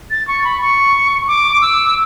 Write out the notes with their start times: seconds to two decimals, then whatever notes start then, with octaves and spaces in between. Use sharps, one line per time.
0.11 A6
0.28 C#6
0.44 B5
0.61 C#6
1.28 D6
1.62 E6